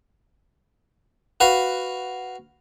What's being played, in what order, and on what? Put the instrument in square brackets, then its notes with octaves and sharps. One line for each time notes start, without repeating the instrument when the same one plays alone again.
[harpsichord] F#4 B4 F5